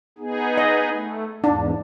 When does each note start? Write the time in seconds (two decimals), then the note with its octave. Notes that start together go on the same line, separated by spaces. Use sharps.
0.18 B3 D#4 G#4
0.58 D#5
0.92 A3
1.44 E2 G#2 D4